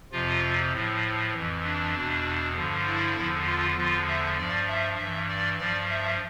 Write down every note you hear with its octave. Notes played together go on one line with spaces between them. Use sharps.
F2 C3 F3 F4
A2 F3
F2 E3
D4
E2 B2
G2 D3 F3
E4
E2 D3 F3
F4
E2 D3 F3 F4
E5
G2 F3 D5
E5
G2 E3 E5
D5
G2 F3 D5
E5